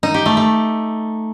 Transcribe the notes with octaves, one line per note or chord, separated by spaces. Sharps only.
D#4
G4
A3
A3